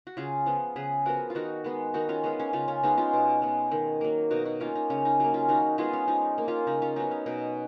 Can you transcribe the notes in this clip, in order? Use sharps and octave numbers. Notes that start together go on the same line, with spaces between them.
F#4
C#3 F4 G#4
F3 B3
C#3 G#4 B4
F3 B3 F#4 A#4
F4
D#3 D#4 F#4
G#3 B3
D#3 D#4 F#4
C#4 F4
G#3 B3 C#4
C#4
C#3 C#4 F4
C#4
G#3 B3 D#4
C#4 F4
B2
G#3 B3
D#3
F#3 A#3
B2 D#4 F#4
D#4 F#4
A#3 C#4 F4
D#4
C#3 C#4
D#4
F#3 A#3
C#4 F4
D#3 D#4 F#4
G#3 B3 F4 G#4
C#4
F3 D#4
A#3
C#4 F4
C#3 D#4
C#4 F4
F#3 B3 D#4
C#4
B2 D#4